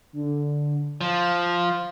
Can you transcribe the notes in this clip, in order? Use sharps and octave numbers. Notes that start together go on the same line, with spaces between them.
D3
F3 F5